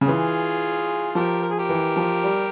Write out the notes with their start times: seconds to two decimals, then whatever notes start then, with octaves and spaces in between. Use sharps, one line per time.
0.01 C#3
0.07 E3 F4 G#4
1.15 F3 G4 A#4
1.42 A#4
1.50 G#4
1.59 G4 A#4
1.69 E3
1.96 F3
2.24 G3